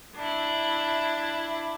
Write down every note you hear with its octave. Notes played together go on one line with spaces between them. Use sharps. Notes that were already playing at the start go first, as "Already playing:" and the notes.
D4 E4